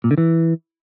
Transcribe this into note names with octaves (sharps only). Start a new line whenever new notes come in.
A#2
D3
E3